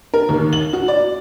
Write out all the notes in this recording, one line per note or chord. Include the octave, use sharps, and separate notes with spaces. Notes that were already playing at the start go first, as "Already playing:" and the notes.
A#4
D#2
F#7
F#4
D5